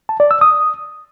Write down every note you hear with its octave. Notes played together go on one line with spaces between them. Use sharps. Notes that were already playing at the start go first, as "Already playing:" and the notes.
A5
D5
E6
D#6